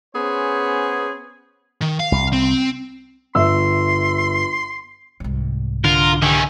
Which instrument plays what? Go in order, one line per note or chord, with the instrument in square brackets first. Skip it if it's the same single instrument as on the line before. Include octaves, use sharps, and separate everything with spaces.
[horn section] B3 C#4 G#4 C5
[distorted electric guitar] D#3
F5
[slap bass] C2
[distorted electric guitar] C4
[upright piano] G1 E5 E6 [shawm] C6
[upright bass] C2 G#2
[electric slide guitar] D3 [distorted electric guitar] F4 [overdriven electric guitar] A#4
[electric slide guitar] D3 G4 [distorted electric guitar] D#3 [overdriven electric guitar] C#4 E4